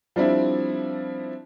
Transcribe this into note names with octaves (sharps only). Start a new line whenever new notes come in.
F3 G3 C4 D4 E4